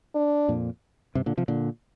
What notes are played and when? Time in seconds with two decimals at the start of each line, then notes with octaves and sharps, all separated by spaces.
0.15 D4
0.48 F2 A#2
1.15 G2 C3
1.26 A#2 D3
1.37 C3 F3
1.48 A#2 D3